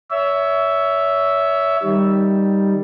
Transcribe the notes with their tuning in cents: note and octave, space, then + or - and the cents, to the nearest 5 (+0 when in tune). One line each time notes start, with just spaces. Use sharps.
C#5 +25 E5 +0
D#3 +0 G3 +0